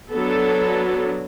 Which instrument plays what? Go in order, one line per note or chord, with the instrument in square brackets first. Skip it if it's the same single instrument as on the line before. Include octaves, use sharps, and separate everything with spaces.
[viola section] F#3 B3 D4 A4